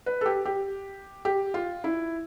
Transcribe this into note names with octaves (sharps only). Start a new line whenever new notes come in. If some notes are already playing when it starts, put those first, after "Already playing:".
B4
A4
G4
G4
G4
F4
E4